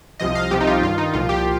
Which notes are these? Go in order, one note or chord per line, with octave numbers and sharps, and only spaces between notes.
C2 C3 F3 D#5
F5
C2 C3 F3 G4
D#4
F4
G2 D#3 F4
D#4
C2 A#2 F3 F4
G4